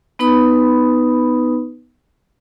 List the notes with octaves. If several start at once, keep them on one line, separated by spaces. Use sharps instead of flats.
B3 D#4 B4 B5 D#6